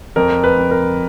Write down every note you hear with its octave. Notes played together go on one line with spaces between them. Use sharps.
F2 A#4
B4
F2
A#4